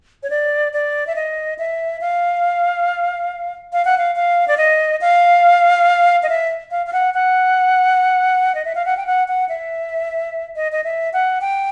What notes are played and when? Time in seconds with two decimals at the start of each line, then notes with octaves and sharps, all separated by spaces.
0.23 C#5
0.30 D5
0.73 D5
1.07 E5
1.16 D#5
1.59 E5
2.01 F5
3.73 F5
3.85 F#5
3.98 F5
4.16 F5
4.48 D5
4.57 D#5
5.01 F5
6.23 D#5
6.29 E5
6.71 F5
6.86 F5
6.93 F#5
7.14 F#5
8.55 D#5
8.65 E5
8.75 F5
8.86 F#5
8.97 G5
9.07 F#5
9.28 F#5
9.49 E5
10.56 D#5
10.72 D#5
10.84 E5
11.13 F#5
11.41 G5